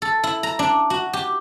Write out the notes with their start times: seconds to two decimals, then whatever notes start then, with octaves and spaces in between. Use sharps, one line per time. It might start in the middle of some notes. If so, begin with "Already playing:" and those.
0.02 A4
0.24 E4
0.43 A#5
0.59 D4
0.90 F#4
1.13 G4